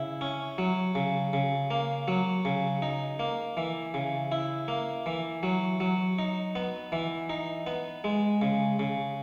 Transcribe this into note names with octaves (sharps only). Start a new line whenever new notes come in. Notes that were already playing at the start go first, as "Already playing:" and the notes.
Already playing: C#3 E4
C#4
F#3
C#3
C#3
A#3
F#3
C#3
D#4
A#3
E3
C#3
E4
A#3
E3
F#3
F#3
D#4
B3
E3
D#4
B3
G#3
C#3
C#3